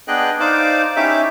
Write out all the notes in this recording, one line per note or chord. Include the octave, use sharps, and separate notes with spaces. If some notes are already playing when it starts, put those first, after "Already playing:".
B3 D4 G#4 D#5 G5 F#6
D#4 C5 D5 F5 D6
C#4 D#4 E4 G4 E5 D6